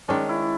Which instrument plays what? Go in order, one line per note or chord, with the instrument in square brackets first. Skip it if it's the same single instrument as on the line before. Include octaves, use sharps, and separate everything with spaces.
[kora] D#3 G#3 C#4 [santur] D4
[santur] E4